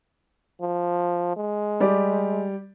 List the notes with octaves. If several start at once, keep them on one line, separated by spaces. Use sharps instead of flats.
F3
G#3
G3 G4 D5